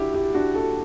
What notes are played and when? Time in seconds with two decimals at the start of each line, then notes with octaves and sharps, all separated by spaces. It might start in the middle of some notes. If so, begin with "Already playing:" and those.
Already playing: D4 E4 F#4 G4
0.14 E4 G4
0.34 D4 F#4
0.55 F#4 A4